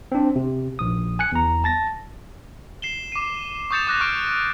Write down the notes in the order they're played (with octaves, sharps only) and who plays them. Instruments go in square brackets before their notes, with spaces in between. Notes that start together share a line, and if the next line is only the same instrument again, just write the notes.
[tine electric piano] C4 D4
C3
A#1 D#6
G#5 F#6 C#7
E2 A#5
A5 A6 A#6
[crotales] C7 E7 G7
D6 D#7
C#6 D#6 G6 A6 C#7 E7
D6 F#6 A#6
C#6 F6 D7